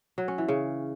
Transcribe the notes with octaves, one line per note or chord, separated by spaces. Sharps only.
F#3
C#4
E3
C#3